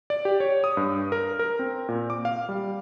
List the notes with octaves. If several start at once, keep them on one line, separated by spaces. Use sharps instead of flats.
D5
G4
C#5
D#6
G2
A#4
A#4
C4
A#2
D6
F5
G3